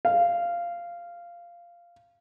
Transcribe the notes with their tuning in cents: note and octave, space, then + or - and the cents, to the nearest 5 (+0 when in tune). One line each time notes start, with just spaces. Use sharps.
F5 -10